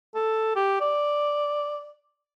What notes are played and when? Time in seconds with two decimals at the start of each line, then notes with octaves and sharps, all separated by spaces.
0.15 A4
0.56 G4
0.81 D5